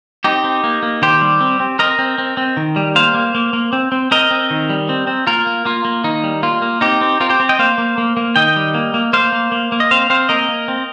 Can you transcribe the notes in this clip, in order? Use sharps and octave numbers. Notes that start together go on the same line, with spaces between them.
C4 D#4 G4
C4
A#3
A#3
D#3 G4 C5
G3
C4
C4
C4 A#4 D#5
C4
C4
C4
D#3
G3
A#3 C5 F5
A#3
A#3
A#3
C4
C4
C4 A#4 D#5
C4
D#3
G3
C4
C4
A#3 F4 A#4
A#3
A#3 F4
A#3
D#3 D#4
G3
A#3 F4
A#3
C4 D#4 G4
C4
C4 F4 A#4
G4 C5
C4
D#5 G5
A#3 C5 F5
A#3
A#3
A#3
D#3 D#5 G5
G3
A#3
A#3
A#3 C5 F5
A#3
A#3
A#3
D#5
C4 C5 F5
C4 C5 F5
A#3 A#4 D#5
A#3
C4